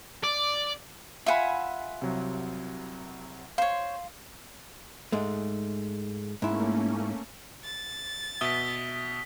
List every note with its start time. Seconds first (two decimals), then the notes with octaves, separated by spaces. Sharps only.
0.24 D5
1.26 F4 E5 F#5 G#5 B5
2.01 C2 C3 F#3
3.58 C5 C#5 F5 C6
5.12 G#2 G#3 A3
6.42 G#2 A3 A#3 C#4 E4
7.64 A6
8.41 B2 E5 D#6 B6 G7